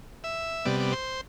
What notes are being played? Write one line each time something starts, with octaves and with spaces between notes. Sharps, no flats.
E5
C3 G3 B3 D5
D5
C5